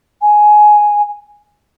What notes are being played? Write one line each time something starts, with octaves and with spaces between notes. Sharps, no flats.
G#5